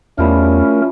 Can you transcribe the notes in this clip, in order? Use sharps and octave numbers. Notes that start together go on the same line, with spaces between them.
E2 F3 G3 A3 C#4 E4 A#4